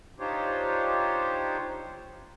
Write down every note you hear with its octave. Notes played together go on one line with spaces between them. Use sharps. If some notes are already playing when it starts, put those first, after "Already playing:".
D4 D#4 F4 G4 C5 C#5